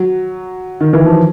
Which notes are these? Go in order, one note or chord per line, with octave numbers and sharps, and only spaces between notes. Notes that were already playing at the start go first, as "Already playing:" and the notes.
Already playing: F#3
D#3
E3
F3